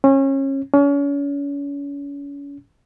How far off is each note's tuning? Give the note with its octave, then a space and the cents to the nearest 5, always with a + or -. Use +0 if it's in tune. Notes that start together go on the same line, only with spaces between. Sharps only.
C#4 -30
C#4 +35